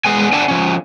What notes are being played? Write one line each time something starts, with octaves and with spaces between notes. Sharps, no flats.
G#3 B3 G#5
D4 D5 F#5 G#5 A5
F3 C#4